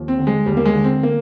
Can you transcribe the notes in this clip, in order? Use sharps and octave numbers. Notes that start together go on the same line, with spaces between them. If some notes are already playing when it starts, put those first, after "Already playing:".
Already playing: D#2 F3
C4
D3
G#3
D#2 G3
A#3
G#3
D3
C4
A#3